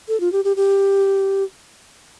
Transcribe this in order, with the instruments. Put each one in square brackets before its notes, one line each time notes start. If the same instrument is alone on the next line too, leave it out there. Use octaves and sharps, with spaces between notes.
[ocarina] A4
F4
G4
G4
G4